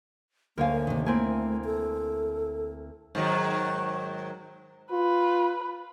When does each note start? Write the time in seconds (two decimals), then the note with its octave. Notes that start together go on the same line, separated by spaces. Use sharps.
0.58 D2 A#3 A#4 C#5 F5 G#5
0.87 C3 D#3
1.06 A3 A#3 C4 E4 G#5
1.65 A4
3.15 G#2 D#3 F#3
4.92 F4 B4